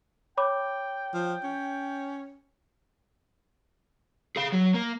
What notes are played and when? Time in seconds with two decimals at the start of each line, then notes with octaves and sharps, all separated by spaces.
0.37 C#5 G5 B5 D6
1.14 F3
1.44 C#4
4.36 G#4 F5
4.52 F#3
4.74 A#3